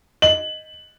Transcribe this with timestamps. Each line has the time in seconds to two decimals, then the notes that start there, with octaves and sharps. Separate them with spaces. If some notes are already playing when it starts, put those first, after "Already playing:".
0.22 D#5 F#7